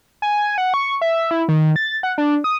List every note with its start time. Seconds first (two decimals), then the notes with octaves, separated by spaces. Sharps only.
0.22 G#5
0.58 F#5
0.74 C#6
1.01 E5
1.31 E4
1.48 D#3
1.76 A6
2.03 F#5
2.18 D4
2.44 D#6